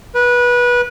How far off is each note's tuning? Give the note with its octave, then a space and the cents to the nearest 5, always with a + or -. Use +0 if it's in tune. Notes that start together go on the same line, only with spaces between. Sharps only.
B4 -20